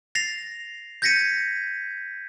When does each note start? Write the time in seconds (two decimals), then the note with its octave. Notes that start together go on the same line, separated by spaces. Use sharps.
0.15 A6 A#6 C7 F7
1.02 G6 G#6 A#6 B6 C#7 D#7